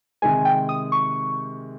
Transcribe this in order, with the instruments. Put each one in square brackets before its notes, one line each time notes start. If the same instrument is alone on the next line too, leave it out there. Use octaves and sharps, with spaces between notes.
[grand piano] C3 D#3 G#3 [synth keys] G#5
[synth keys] G5
D#6
C#6